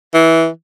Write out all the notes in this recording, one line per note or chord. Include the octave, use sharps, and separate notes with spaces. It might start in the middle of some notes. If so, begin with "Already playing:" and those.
E3